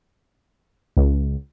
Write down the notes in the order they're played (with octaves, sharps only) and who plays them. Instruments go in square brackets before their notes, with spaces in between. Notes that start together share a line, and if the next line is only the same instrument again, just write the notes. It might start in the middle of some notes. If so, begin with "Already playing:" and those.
[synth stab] C#2